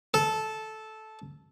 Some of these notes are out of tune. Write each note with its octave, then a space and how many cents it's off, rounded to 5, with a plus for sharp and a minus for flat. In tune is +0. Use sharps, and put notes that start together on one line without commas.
A4 -10